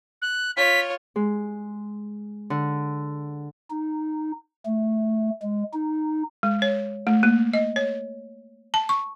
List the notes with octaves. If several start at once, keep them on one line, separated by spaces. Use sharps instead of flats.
F#6
F4 C#5 B6
G#3
D3
D#4
A3
G#3
D#4
G#3
C#5
A3
A#3
D#5
C#5
A5
C#6